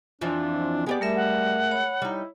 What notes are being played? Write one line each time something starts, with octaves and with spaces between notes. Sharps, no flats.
F2 E3 F3 D4
G#3 B3 G4 D5
G3 A3 A#4 E5
F#5
C#5 B5
G3 D#4 E4